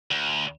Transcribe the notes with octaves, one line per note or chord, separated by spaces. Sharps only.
D2